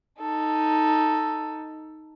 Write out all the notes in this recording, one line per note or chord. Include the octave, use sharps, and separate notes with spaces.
D#4 A4